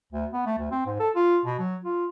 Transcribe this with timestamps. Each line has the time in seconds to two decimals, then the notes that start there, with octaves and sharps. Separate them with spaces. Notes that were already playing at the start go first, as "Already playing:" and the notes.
0.12 D2
0.33 B3
0.46 A3
0.58 D2
0.71 C4
0.86 G#2
1.00 A4
1.15 F4
1.45 B2
1.59 F#3
1.84 F4